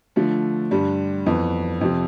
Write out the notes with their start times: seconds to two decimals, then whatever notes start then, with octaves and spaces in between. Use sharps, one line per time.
0.16 D3 F3 A3
0.71 G2 D3 G3
1.26 F2 E3 B3
1.81 F2 C3 F3